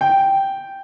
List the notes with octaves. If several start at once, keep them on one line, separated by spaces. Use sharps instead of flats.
G5